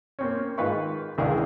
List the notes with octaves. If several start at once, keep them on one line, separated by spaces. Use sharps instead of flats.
A#3 C4 C#4
G#2 D#3 F4 B4 F5 C#6
C#2 D3 D4 E4 G#4 F5